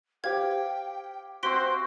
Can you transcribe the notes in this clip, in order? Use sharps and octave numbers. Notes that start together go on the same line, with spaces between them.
G4 C5 F5 G5 G#6
C4 F#4 C5 C6 B6 D7